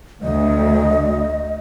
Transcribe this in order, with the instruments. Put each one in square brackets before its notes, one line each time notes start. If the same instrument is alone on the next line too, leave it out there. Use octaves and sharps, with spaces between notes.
[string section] D2 [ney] D#5